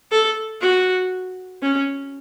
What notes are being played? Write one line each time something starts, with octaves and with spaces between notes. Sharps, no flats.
A4
F#4
C#4